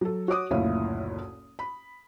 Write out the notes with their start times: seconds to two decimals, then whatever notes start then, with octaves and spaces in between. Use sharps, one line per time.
0.01 F#3 A4
0.28 F#4 C#5 D6 D#6
0.51 F#1 D2 A#2 E4 C#5 F5
1.59 B5